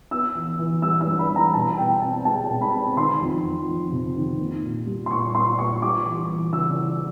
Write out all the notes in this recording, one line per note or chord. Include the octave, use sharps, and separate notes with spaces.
B3 E6
E3
E3
G3 E6
E6
G2
B5
E3
A#5
B2 A5
B2 G5
C4 A5
G#3 A5
B2
B5
C4
D#3 C6
F2
F2
F2
C3
D#3
A#3
A#2
G3
C6
A#2 C#6
A#2 C6
A#2 C#6
G3 D6
E3
E3
C#3 E6
E3